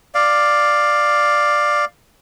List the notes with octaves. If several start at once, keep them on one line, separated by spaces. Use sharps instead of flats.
D5 F5